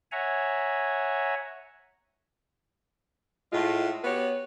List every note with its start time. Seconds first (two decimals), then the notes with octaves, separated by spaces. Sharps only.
0.12 C#5 E5 F#5 G#5 A#5
3.53 A2 G#3 A3 F4
4.04 B3 F#4 G4 B4 C#5